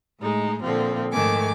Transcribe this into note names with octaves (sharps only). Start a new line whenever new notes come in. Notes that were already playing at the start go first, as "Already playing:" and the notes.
A2 G#3 D#4
A#2 D3 F3 C4
G#2 D#3 F3 A3 G#5 D6